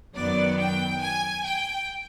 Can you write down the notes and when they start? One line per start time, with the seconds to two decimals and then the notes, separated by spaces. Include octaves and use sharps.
0.15 F#2 D#3 F#3 B3 D5
0.59 G5
1.03 G#5
1.45 G5